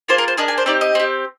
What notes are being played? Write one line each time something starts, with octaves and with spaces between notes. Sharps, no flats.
A#3 F4 G#4 C5
A#4
C5
A#3 D4 G#4 D#5
G#5
C5
C4 D#4 G4 D5
D#5
C4 G4